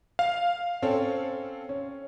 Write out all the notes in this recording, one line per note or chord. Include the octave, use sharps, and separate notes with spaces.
F5
C4 C#4 A4
C#4